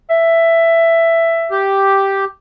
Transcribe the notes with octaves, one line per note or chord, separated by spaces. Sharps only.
E5
G4